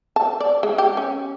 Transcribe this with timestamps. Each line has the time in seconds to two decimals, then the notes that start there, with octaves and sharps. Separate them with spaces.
0.16 A5
0.40 D5
0.63 G#3
0.78 G4
0.97 C#4